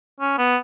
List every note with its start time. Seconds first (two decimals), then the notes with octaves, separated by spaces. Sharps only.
0.21 C#4
0.38 B3